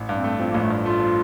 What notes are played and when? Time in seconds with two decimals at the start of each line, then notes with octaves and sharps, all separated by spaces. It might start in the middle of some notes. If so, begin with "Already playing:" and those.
Already playing: A1
0.09 G2
0.17 C4
0.24 A3
0.39 F3 C4
0.51 A#3
0.54 A1
0.62 A3
0.70 G2
0.85 A3 F4
1.00 F3